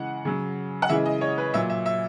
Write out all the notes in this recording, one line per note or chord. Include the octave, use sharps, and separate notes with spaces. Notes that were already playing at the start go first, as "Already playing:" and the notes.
Already playing: C#3 E3 G#3 F#5
C#3 F#3
F#5
C#3 E3 G#3 E5
D#5
C#5
B4
A#2 F#3 E5
E5
E5